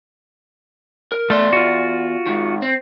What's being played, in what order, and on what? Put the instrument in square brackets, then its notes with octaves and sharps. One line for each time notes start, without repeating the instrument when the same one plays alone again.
[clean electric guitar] A#4
[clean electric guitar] E2 D5 C6 [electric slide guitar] A3
[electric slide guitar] F4 F#4
[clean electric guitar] G#2 D#3
C4